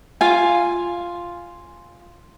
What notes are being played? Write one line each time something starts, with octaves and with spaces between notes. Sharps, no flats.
F4 F5 G#5